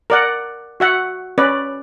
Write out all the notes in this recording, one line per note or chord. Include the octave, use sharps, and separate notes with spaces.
A#4 D5 F#5
F#4 E5 F#5
C#4 B4 D5